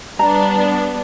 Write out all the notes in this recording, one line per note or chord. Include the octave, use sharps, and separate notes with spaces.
G3 B3 D4 A#5